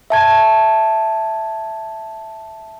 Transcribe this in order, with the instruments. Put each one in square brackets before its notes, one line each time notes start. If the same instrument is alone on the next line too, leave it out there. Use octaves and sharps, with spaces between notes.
[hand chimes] E5 A5 G#6